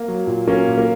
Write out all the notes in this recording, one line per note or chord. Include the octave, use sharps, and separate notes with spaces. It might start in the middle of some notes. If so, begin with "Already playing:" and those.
Already playing: A#3
F#3
A#2
F#3 A#3 C#4
A#2
A#3